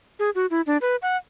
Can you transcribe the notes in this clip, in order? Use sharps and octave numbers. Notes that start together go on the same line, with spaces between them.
G#4
F#4
E4
D4
B4
F#5